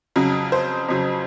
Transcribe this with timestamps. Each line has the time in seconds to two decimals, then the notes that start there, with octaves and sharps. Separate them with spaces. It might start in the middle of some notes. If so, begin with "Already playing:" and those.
0.16 F2 C#3 F#3
0.52 C5
0.88 F2 C#3 F#3